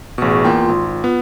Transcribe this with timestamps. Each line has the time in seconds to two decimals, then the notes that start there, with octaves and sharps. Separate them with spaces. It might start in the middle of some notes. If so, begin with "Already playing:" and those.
0.18 A1 B2 G#4 C#6
0.45 E2 A#3 F4 G5 C6
0.69 G#1
1.04 B3 F4